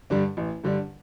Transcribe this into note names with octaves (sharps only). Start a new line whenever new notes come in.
G2 D3 G3 D4
A1
G2 D3 G3 D4